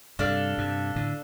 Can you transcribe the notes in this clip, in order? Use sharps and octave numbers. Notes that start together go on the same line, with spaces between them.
G2 C3 D4 A4 F5
G2 C3
A2 D3